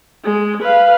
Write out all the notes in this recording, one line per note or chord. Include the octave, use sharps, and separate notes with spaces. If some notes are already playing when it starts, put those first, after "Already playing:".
G#3
B4 F5